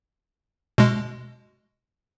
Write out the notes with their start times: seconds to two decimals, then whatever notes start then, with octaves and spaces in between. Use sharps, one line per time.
0.78 B2 G#3